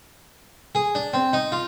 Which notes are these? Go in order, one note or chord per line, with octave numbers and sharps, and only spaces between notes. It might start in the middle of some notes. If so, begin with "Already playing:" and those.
G#4
D4
C4
D#4
F4